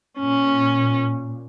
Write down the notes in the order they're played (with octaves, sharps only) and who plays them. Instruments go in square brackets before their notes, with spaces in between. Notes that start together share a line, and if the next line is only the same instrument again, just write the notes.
[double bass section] A#2 [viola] C#4